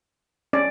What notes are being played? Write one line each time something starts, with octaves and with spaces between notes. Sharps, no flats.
C#4 D5